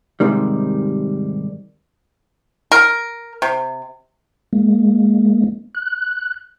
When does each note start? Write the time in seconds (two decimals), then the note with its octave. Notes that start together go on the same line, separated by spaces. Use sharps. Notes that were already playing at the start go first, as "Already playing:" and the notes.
0.20 G#2 C3 D#3 G3
2.72 A#4
3.42 C3
4.53 G#3 A#3
5.75 F#6